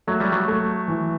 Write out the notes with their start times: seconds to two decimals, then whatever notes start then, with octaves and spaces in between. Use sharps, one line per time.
0.07 F#3 A3
0.20 G3
0.32 F#3
0.48 A3
0.88 E3